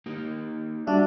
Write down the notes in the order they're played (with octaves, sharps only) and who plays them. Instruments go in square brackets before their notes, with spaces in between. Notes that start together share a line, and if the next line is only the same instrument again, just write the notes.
[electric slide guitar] A#3 D#4 G4
[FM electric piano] G3 F#4 E5 [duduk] D4